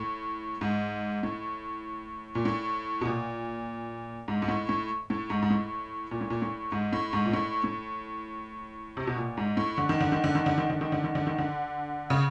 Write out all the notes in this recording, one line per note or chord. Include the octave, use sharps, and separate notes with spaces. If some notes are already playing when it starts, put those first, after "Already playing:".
Already playing: A2
G#2
A2
A#2
A2
B2
A#2
G#2
G#2
A2
A2
A2
G#2
G#2
A2
A#2
A2
A#2
A2
G#2
A2
G#2
A#2
A2
A2
C3
B2
A#2
G#2
A2
D3
D#3
D3
D#3
D3
D#3
D3
D#3
D3
D#3
D3
D#3
D3
D#3
D3
C#3